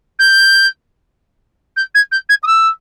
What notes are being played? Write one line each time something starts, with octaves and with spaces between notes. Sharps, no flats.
G6
G6
G#6
G6
G#6
D#6
E6